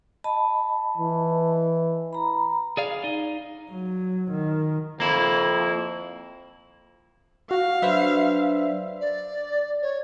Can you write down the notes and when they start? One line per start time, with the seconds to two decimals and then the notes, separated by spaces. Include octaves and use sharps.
0.24 D#5 A5 B5
0.98 E3
2.13 A#5 B5
2.77 G#4 D5 F5
3.04 D#4
3.71 F#3
4.31 D#3
5.00 F2 A#3 E4
7.51 F#4 F5
7.82 F#3 D4 B4 C5 E5
9.00 D5
9.82 C#5